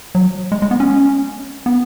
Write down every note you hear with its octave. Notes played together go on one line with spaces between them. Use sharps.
F#3
G#3
G#3
B3
C#4
B3